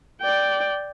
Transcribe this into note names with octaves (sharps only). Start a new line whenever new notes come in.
D5 G5